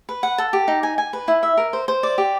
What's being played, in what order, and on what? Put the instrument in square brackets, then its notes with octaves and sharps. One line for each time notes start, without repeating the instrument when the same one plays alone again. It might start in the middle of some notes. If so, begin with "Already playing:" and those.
[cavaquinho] B4
F#5
A4
G4
D#4
G#5
G#5
B4
E4
E5
A#4
C5
C5
D5
G4